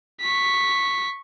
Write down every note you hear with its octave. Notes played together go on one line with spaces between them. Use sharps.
C#6 B6